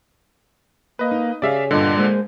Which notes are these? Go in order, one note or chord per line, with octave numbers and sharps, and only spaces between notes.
A#3 B4 D#5
D#4
C#3 G4 G#4 D5 E5 F5
G2 A#2 D3 B3 D#5
G#3 A#3 C5